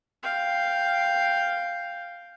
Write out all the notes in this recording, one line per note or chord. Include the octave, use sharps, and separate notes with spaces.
F5 G5